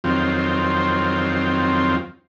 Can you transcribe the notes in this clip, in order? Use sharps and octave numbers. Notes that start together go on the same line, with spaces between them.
F2 D#3 F#3 C4 F4